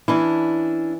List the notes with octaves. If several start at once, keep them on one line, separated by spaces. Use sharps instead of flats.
E3 C#4 D4 E4